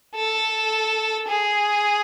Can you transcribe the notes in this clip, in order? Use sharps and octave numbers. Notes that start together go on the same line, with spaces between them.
A4
G#4